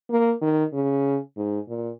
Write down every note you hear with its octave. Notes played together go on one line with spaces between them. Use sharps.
A#3
D#3
C#3
G#2
A#2